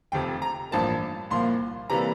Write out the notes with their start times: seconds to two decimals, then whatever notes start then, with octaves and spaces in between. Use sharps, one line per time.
0.12 F1 F2 C3 G5
0.42 A#5
0.71 A1 G2 F3 A#3 A5
1.31 C2 A#2 F3 A#3 C6
1.90 C3 E3 G3 A#3 A#5